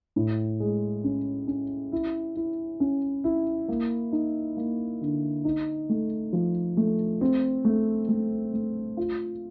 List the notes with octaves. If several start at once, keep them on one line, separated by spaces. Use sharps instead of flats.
A2
G#3
C#4
C#4
E4
E4
C#4
E4
A#3
D#4
A#3
D3
D#4
A3
F3
A3
C4
A3
A3
A3
F4